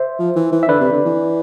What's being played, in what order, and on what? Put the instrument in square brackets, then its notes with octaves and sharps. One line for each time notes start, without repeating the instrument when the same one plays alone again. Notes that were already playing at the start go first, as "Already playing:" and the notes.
Already playing: [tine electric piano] C5 E5
[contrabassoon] F3
E3
E3
[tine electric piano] E5
[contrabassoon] D3 [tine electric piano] B4 D5
[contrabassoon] C3
D3
E3